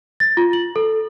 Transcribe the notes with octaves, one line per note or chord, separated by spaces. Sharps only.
A6
F4
F#7
A4